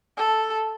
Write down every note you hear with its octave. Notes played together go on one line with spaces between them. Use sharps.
A4